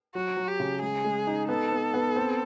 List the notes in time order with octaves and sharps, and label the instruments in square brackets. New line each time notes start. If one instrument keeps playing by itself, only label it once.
[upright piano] F#3 [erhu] F#4
[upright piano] F#3
[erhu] G4
[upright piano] C#3
[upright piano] G#3 [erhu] G#4
[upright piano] G#3
D#4
[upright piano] B3 [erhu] A4
[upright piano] B3
B3
C4